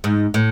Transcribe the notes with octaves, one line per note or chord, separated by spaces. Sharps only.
G#2
A2